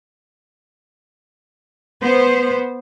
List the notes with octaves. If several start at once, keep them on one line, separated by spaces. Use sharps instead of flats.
B3 C5